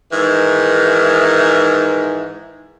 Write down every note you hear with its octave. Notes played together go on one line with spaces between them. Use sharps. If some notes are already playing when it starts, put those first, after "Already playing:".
G#2 D#3 E3